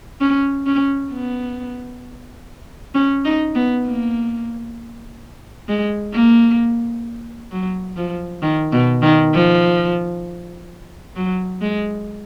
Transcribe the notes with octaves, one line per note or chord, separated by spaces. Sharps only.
C#4
C#4
B3
C#4
D#4
B3
A#3
G#3
A#3
F#3
F3
D#3
B2
D#3
F3
F#3
G#3